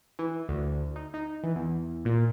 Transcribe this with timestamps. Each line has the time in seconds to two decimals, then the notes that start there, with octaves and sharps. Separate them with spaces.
0.19 E3
0.49 D2
0.96 D#4
1.14 D#4
1.43 E3
1.56 E2
2.05 A#2